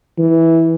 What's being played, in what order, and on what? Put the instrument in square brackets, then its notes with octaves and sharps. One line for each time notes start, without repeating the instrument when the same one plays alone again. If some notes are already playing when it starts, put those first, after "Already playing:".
[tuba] E3